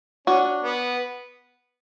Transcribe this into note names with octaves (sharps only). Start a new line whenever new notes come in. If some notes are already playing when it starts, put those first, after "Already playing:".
C#4 D4 F#4
B3